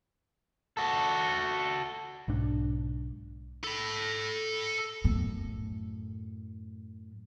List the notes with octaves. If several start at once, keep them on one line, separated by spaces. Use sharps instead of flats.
F#4 A4
B1 G#2 D4
A4 B5
F#2 A2